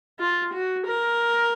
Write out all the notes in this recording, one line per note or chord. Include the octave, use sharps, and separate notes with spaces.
F4
F#4
A#4